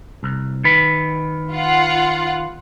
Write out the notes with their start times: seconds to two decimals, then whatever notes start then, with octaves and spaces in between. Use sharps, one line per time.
0.23 C2
0.64 D#3 B4
1.52 F4 F#5